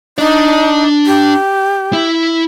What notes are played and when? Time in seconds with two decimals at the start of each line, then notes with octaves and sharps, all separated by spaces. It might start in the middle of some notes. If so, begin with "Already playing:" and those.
0.18 D4 D#4 D5
1.06 G4
1.93 E4